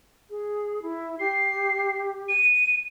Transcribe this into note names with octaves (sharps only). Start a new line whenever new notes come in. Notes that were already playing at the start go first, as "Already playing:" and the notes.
G#4
E4
G4 C7
D#7